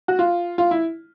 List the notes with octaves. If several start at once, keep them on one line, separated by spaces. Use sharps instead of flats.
F#4
F4
F4
E4